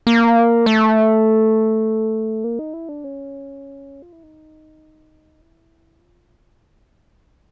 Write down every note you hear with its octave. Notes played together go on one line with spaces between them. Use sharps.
A#3
A3
A#3
D#4
E4
D4
C#4
F4
E4
D#4
E4
F4
E4
D#4
D4